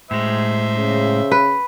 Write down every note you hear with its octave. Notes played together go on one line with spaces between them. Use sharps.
A2 G#3 C5 E5
C#3
B4